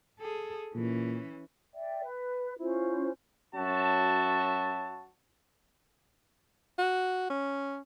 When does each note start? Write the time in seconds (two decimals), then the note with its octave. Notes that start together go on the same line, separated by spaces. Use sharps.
0.20 G#4 A4
0.75 A#2 E3 C#4
1.75 D5 E5 G5
2.04 B4
2.59 C#4 E4 F4 C5
3.55 F#2 F#4 C#5 E5 A5
6.78 F#4
7.30 C#4